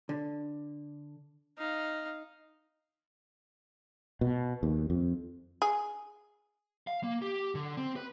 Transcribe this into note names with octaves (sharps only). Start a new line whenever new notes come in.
D3
D#4 F5
B2
D#2
F2
G#4
F5
A#3
G4
D3
C4
B4